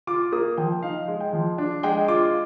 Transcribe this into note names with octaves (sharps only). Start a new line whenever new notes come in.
F4 D6
A#3 D#6
F3 G5
D#4 F5
G#3
G5
F3
D4
G#3 G5
F4 D6